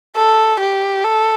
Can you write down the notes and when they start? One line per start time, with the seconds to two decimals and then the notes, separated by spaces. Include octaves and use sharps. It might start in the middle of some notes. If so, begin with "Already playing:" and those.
0.16 A4
0.60 G4
1.04 A4